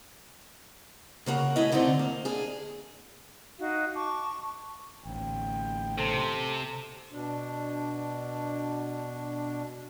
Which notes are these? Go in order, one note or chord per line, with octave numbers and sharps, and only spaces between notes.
C#3 A#3 F#4 A#4
A3 C#4 E4 D#5
G2 D3 A3 C4 D#4 F4
A#3
A#3 D4 G#4
D#4 F#4 F5
A5 C#6 D6
A1 D2 G5
C3 A4 C5
B2 D4